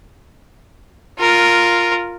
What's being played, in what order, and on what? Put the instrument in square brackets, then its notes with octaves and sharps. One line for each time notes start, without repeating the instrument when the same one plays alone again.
[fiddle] F4 A#4